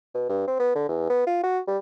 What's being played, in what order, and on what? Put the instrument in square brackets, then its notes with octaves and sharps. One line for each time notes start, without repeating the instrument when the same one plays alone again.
[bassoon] B2
G2
C4
B3
D3
E2
B3
F4
F#4
G3